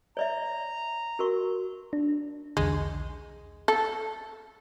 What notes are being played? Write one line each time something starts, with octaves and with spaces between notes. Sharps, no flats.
C#5 D5 E5 A#5
F#4 A#4 C#6
D4
B1 E2 D3 G#3
A4